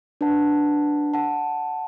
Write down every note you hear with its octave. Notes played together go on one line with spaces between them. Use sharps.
D4 B4 F#5 A5
F#5 A5